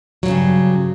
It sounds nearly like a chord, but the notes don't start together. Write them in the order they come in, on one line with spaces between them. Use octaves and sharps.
F#3 A#2 C#3 G2